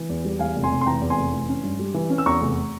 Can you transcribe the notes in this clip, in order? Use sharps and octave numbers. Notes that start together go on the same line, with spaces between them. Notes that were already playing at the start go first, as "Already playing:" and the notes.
Already playing: E3
E2
G3
E2 F5 G#5
F1
G#5 C6
F1
C6
E3 G5 A#5
E2
G#5 C6
F1
E3
C#4
G2
G3
E3
C#4
E6
E2 A#5 C#6
F1